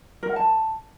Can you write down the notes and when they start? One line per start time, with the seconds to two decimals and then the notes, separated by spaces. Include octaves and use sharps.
0.23 A#4
0.29 F#5
0.36 A5